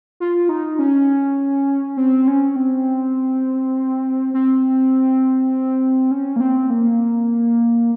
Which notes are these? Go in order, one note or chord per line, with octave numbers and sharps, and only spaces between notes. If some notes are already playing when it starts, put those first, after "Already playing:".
F4
D#4
C#4
C4
C#4
C4
C4
C#4
A#3
C4
A#3